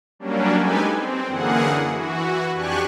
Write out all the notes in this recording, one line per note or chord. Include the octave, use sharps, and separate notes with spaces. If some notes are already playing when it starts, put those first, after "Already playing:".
F#3 G3 A#3 C#4 D4
G#3 D#4 G4 A4 B4 G#5
C4
F#2 D3 E3 A#3 G#4 F#5
E3 F#4
F2 D4 G4 G#5 C#6 F#6